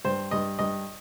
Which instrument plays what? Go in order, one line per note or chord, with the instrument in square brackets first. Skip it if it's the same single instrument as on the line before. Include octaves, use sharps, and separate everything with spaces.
[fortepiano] G2 C5
G2 D#5
G2 D#5